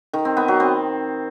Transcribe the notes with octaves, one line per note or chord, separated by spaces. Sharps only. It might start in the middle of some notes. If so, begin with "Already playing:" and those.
D#3
C4
B3
F#3
C4